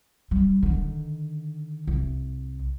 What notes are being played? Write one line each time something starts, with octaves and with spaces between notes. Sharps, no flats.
G3
D3 D#3
C2